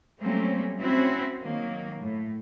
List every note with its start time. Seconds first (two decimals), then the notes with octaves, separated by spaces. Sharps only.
0.21 F#3 G3 A3 A#3 C4 C#4
0.80 C4 C#4 E4 F#4
1.42 D#3 F#3 A#3
2.00 A2